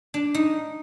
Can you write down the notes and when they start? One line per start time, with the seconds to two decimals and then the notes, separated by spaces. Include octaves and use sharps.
0.14 D4
0.34 D#4